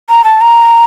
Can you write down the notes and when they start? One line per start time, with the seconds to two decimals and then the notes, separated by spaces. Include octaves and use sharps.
0.09 A#5
0.24 A5
0.41 A#5